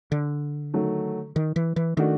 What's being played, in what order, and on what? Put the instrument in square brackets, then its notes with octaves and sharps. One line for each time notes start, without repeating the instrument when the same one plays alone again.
[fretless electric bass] D3
[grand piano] D#3 F#3 A3
[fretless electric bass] D#3
E3
E3
[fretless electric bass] D#3 [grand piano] A3 D4 F#4